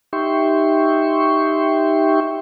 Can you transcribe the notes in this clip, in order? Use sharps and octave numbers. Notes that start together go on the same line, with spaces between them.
D#4 G4 E5 G5 C6 C#6